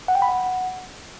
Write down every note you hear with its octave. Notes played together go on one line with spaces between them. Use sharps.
F#5
G5
B5
F#5